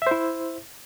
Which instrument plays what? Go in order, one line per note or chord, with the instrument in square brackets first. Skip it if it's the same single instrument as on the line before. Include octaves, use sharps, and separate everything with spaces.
[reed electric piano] E5
C5
E4